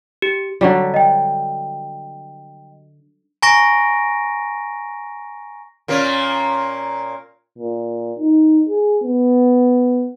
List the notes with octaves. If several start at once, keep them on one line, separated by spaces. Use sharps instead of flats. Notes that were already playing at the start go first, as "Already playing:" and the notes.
G4
D3 F#3 G3
D#5 G5
G#5 A#5 C#6 A#6 D7
A#2 A#3 C#4
A#2
D#4
G#4
B3